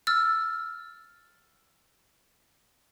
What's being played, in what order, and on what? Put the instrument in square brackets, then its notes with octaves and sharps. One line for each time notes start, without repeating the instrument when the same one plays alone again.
[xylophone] E6 F6 A6